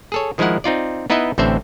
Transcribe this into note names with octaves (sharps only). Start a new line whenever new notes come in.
G#4 A4 C#5
D#3 F3 G#3 E4 A#4 F#5
C4 D#4 F4 D5
B3 D#4 E4 B4 D#5 E5
A1 A2 D3 C4 C5 E5